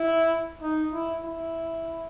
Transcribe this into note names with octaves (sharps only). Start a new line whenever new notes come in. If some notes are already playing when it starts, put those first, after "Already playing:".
Already playing: E4
D#4
E4
E4